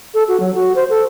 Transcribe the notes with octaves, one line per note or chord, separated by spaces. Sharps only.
A4
F#4
F#3
F#4
C5
A4